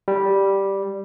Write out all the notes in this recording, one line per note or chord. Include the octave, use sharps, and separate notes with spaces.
G3